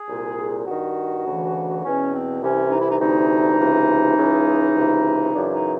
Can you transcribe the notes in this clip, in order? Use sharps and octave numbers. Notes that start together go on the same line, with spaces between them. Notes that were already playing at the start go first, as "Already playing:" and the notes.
Already playing: G#4
C2 A#2
G2 D#3 F#4
D2 C#3 E3
E2 B2 C#4
C4
C2 C3 E3 C#4
D#4
E4
D#4
D2 C3 E3 D#4
C#2 C3 E3
C#2 C#3 E3
C#2 C3 E3
F#2 C#3 E3 D4
D#4